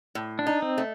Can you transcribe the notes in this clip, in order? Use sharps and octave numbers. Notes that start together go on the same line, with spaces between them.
A2
D4
D#4
C4
A3